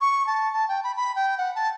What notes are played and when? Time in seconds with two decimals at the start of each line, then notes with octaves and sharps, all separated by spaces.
0.01 C#6
0.27 A5
0.53 A5
0.68 G5
0.84 B5
0.97 B5
1.16 G5
1.38 F#5
1.55 A5